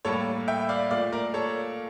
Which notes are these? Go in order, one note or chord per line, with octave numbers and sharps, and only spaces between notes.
A2 G3 A#3 A4 C#5
E5 G5
D5 F5
A#2 A3 D5 F5
A#4 D5
A4 C#5